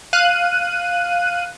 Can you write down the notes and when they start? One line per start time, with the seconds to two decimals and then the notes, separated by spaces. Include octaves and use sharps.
0.13 F5 F#6 D#7